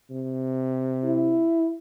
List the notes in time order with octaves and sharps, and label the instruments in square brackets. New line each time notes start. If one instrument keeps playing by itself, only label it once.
[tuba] C3
[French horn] E4